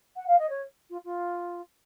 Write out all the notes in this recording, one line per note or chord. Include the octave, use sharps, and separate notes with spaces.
F#5
F5
D#5
C#5
F4
F4